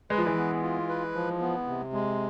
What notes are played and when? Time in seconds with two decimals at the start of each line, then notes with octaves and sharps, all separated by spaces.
0.10 G#3 B4
0.18 F3
0.26 E3 G#3
0.37 B3
0.62 F4
0.89 B4
1.14 F3
1.41 B3
1.67 C3
1.93 G#3